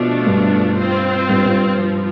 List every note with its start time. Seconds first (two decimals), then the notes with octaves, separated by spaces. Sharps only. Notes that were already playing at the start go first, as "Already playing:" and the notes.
Already playing: B2 F3 A3 D4
0.27 G2
0.78 C4 F4 C5
1.29 G2
1.46 G2
1.80 F3